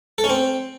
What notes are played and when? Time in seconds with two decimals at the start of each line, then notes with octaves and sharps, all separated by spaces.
0.18 A4
0.24 C#4
0.30 C4